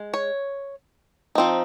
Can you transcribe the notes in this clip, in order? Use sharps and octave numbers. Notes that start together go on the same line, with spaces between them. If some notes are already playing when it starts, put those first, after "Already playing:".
Already playing: G#3
C#5
F3 C4 D#4